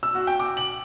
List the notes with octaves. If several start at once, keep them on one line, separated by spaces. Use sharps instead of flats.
E6
F#4
G5
D6
F#7